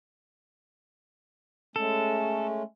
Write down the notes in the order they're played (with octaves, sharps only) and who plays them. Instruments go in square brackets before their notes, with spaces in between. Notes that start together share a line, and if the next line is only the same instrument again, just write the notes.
[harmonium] G#3 A3 C#4 [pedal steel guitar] A4